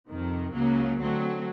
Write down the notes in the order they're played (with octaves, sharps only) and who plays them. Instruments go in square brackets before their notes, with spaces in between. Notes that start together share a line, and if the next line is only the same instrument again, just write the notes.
[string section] F2 C3 D#3
C#2 C#3 F#3 A#3
D3 F#3 A3 C4